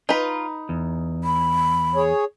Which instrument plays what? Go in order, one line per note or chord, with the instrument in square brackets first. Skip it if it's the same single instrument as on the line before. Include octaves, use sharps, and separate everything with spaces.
[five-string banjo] D#4 B4 [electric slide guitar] F4
[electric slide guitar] E2
[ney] B5
[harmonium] G#4 C#5